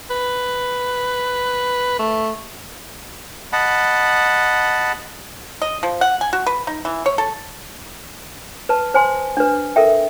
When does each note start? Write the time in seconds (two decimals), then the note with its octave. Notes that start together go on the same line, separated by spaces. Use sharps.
0.10 B4
1.99 A3
3.53 D#5 F#5 A5 B5
5.62 D#5
5.83 F3
6.01 F#5
6.21 G#5
6.33 F#4
6.46 B4
6.67 D#4
6.85 E3
7.06 C#5
7.18 A4
8.69 B4 A5
8.94 C5 G#5 C6
9.37 D4 B4
9.76 A4 A#4 E5 G5